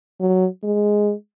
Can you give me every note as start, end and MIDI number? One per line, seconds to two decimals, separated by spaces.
0.20 0.47 54
0.64 1.13 56